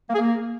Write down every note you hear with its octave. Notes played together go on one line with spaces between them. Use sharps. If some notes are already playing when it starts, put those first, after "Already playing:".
A#3
G#4
A#3